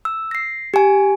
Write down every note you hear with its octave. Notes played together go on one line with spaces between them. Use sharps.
E6
A#6 C7
G4 G#5